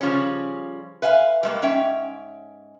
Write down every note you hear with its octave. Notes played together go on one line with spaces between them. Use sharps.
C#3 F3 G3 C#4
B4 E5 F5 G#5
G3 G#3 A#3
G#2 C#4 E5 G5